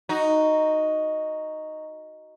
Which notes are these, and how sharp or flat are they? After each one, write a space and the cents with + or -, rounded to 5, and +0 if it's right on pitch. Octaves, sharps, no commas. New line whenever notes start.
D#4 +0 F#4 +0